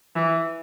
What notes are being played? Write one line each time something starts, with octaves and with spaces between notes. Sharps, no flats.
E3